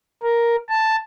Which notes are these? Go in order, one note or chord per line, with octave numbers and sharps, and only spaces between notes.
A#4
A5